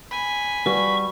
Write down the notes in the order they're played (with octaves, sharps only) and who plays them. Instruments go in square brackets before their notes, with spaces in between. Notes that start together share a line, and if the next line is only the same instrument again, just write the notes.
[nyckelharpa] G#5 [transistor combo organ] B5
[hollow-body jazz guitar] G3 F#4 B4 [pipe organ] C#6